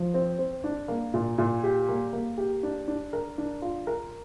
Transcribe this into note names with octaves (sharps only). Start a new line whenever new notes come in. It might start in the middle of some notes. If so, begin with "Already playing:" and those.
Already playing: F3
C4
C4
D4
A#3
A#2
A#2
G4
A#3
A#3
G4
D4
D4
A#4
D4
F4
A#4